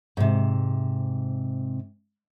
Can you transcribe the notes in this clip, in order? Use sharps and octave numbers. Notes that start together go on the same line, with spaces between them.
G#2 C3